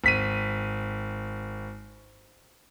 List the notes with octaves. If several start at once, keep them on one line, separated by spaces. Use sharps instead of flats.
G#1 B6 D#7